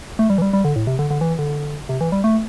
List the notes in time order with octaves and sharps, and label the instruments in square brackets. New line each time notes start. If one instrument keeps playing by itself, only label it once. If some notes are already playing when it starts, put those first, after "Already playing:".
[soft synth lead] A3
G3
E3
G3
G3
D3
A2
C3
D3
D3
E3
D3
C3
E3
G3
A3